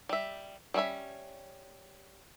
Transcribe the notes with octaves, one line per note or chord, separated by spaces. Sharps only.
G3 E5
G3 C4 C#4 E5 B5